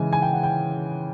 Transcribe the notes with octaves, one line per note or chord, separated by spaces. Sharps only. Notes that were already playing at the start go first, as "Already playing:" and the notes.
Already playing: C#3 E3 G#3 G#5
G#5
G5
F#5
G5